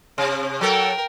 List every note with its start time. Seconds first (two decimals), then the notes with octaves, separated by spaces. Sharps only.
0.18 C3
0.61 F#3 A4 A#4 G5